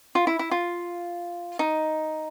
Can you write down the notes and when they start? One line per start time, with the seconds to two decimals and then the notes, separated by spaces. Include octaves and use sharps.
0.15 F4
0.27 E4
0.39 E4
0.51 F4
1.59 D#4